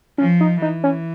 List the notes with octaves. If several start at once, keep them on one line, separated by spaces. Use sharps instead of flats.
F3 C#4
D#4
E3 D#4
C#4